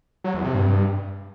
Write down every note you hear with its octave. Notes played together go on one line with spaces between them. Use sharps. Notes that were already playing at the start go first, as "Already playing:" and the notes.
F#3
E2
C3
G2